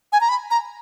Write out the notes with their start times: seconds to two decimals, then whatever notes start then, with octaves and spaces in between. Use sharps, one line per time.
0.13 G#5
0.21 A#5
0.29 B5
0.51 A#5